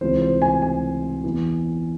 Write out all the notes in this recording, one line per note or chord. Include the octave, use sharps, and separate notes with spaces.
C#2 C3 E3 C5
C5
G#5
G#5
E2 E3